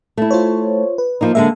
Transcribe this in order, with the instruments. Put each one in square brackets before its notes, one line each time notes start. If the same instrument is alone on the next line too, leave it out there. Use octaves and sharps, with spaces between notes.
[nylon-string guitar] A3 E4
[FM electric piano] F4 C5 C#5
B4
[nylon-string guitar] F3 A#3 D#4
[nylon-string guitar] D3 G#3 A#3 [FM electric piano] E5